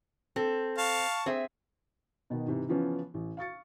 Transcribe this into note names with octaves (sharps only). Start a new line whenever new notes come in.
C4 A4
F5 A5 C#6
C4 G#4 C5 E5
B2 D#3 B3
G#2 C3 E3
C#3 E3 F3 B3 C#4
A1
F5 C#6 A6 C#7